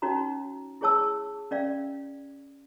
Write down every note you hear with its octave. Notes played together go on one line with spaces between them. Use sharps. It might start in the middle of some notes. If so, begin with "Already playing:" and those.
C#4 D#4 F#4 C#5 A#5
E4 G#4 C#5 A5 E6
C#4 D5 F5